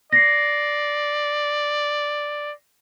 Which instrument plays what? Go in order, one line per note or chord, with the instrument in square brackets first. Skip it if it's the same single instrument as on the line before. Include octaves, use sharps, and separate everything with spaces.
[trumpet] D5 [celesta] A#6 C7